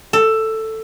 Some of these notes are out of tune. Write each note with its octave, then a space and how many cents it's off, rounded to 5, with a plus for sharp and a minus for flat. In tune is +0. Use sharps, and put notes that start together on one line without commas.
A4 +10